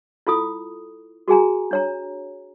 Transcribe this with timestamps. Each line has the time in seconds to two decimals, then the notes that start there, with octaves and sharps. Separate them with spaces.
0.27 E4 F4 A4 D#6
1.28 F#4 G#4 G#5 A#5
1.71 D4 C#5 A#5